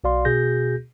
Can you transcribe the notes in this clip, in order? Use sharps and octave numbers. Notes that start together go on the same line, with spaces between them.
B1 F#4 D5 F5 C6
B2 F#4 G#4 G6 A#6